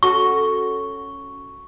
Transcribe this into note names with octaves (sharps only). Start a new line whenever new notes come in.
C#4 F#4 A4 C#6